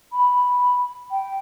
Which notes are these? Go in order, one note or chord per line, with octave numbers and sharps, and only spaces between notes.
B5
G5